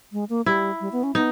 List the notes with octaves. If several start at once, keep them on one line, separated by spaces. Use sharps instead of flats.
G#3
A#3
G3 E4
G3
B3
C#4
B3 D#4